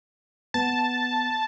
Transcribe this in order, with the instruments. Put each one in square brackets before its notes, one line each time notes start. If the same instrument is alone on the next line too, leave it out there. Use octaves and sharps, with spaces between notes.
[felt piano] B3 B4 [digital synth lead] A5